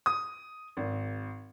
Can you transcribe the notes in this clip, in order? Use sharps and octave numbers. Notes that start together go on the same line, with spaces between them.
D#6
G#1